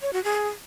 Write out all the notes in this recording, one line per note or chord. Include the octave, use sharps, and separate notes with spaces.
C#5
F#4
G#4